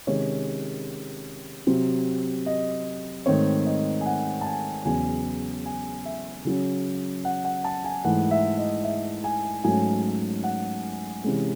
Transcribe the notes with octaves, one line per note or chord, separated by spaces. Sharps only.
C3 D#3 G#3 C#4 C#5
C3 F#3 C4
D#5
G#2 D#3 A3 C4 C#5
D#5
G#5
F#5
A5
G#5
E2 C#3 F#3 G#5
G#5
E5
C#3 F#3 C#4
F#5
F#5
A5
G#5
G#2 E3 A3 F#5
E5
D#5
E5
G#5
G#2 F#3 A3 C#4 G#5
F#5
C3 E3 G#3 C#4